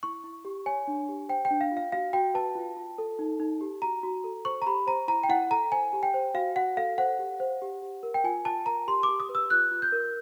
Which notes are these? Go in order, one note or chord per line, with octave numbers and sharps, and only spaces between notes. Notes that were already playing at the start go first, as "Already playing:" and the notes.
E4 C#6
E4
G4
C#5 G#5
D4
G4
C5 G5
G5
D4
F5
F4
F5
F#4 F5
F#4 G5
B4 A5
F4
F4
A4
D#4
D#4
G4
F#4 A#5
F#4
A4
C5 C#6
A#5
G4 B5
C5 A#5
E4 A#5
G5
E4 F#5
A4 A#5
C5 G#5
G4
G5
C5
F#4 F5
F#4 F#5
A4 F5
C5 F#5
G4
C5
G4
G4
A#4
G5
F4 G#5
F4 A5
A#4 A#5
G4 C6
D6
G4
D#6
B4
E6
F4 F#6
F4
G6
A#4